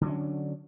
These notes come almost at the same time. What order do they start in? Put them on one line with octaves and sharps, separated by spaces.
D3 F#3 C#4 D4